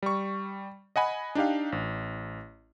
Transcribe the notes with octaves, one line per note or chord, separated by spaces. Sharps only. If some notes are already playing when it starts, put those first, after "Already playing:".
G3 C#6
D#5 F#5 G#5 B5
D4 D#4 G4 F5
A1